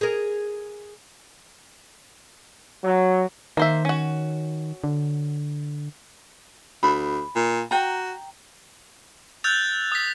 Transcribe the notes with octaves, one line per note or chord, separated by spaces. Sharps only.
G#4 A#4
F#3
D#3 A#3 C5 E5
C#4 F#4
D3
D2 B5
A#2
F#4 G5 A#5
E6 F#6 G6 A6 F7
D#6 B6